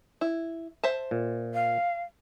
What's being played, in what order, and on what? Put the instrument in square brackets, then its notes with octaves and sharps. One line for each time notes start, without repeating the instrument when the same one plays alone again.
[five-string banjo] E4
C5 E5 A5
[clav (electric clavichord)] A#2
[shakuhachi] F5